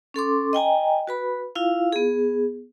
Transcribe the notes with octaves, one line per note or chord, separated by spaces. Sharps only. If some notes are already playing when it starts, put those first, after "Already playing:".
C#4 A4 C6 D6
D#5 G5 G#5 A#5
F#4 B4 B5
E4 F4 F5
B3 G#4